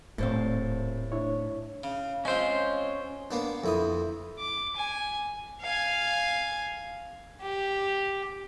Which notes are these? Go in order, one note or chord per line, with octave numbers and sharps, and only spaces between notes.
D#1 A2 A3 C4 C5 F5
D4 E4 C#5
C#3
G#3 C4 C#4 F4 C5
A#3 B3 D4
F2 E4 D#6
D6
G#5
F5 G#5
G4